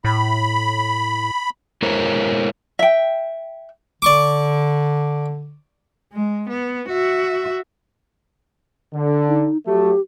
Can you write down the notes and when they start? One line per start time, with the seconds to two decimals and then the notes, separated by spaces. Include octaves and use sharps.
0.05 A2 B5
1.82 G#3 E4 A#4 C5 C#5
2.79 E5 G5
4.02 D3 D5 C#6 D6
6.13 G#3
6.49 B3
6.89 F#4 E5
8.94 D3
9.28 D#4
9.66 F#3 A3 G4